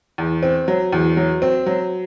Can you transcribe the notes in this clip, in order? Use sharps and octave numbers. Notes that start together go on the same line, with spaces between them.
E2
C4
F#3
E2
F#3
C4
F#3